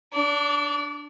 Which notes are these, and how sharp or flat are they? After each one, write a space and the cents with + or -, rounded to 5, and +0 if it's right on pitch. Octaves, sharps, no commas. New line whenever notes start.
D4 +0 D5 -35